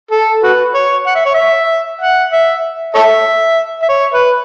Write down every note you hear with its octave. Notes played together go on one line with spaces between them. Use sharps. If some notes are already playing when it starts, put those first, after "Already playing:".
A4
F#4 B4
C#5
F#5
E5
C#5
E5
F#5
E5
A4 C#5 E5
E5
C#5
B4